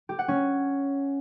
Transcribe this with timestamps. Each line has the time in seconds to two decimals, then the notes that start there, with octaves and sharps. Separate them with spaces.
0.09 G4
0.19 F#5
0.28 C#4